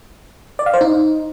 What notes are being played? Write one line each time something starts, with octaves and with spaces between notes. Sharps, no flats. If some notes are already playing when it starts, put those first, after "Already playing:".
D5
F5
C5
D#4